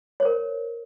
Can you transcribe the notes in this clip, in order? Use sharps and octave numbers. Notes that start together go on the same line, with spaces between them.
A#4 C5 C#5